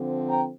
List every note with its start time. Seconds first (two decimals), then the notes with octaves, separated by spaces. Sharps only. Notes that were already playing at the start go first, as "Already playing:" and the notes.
Already playing: D3 F3 C4
0.27 G5 A#5